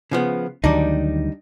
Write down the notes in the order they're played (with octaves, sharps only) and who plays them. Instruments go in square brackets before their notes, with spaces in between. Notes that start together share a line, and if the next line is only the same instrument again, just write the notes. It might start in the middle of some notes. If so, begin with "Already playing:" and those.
[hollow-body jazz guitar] C#3 F3 B3
[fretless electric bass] D2 D#3 F#3 [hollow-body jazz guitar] G3 D4 D#4